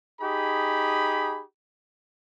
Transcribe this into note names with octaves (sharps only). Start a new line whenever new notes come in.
D#4 G4 G#4 B5